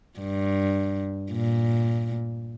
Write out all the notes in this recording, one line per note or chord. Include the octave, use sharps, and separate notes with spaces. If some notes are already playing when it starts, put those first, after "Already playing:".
G2
A#2